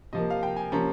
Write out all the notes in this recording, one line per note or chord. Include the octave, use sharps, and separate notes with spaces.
C3 F3 A#3 D#5
F5
G5
G#5
C3 F3 A#3 C#4 A#5